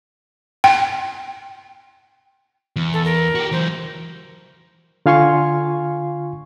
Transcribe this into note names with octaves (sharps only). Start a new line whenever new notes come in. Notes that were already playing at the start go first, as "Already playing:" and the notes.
G5
E2
A4
A#4
F#4 G4
E3 F#3 C5
D3 F4 F5 G#5 C6 C#6